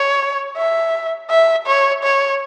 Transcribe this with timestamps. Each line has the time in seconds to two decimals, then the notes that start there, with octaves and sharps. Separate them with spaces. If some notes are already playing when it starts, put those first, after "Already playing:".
Already playing: C#5
0.57 E5
1.30 E5
1.66 C#5
2.03 C#5